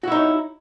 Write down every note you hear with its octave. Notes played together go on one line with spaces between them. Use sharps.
D#4 E4 F#4 C#5